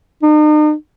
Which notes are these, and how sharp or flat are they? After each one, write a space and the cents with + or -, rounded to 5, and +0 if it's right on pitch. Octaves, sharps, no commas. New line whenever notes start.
D#4 -45